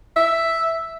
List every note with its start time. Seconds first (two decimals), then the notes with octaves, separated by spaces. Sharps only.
0.16 E5